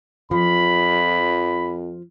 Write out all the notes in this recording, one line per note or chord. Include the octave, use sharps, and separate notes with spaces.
F2 F3 B5